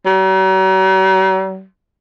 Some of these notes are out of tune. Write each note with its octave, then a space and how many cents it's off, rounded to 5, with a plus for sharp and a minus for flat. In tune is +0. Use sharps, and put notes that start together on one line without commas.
F#3 +45